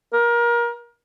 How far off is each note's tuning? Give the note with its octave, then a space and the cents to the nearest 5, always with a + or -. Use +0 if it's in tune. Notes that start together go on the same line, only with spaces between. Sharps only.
A#4 +25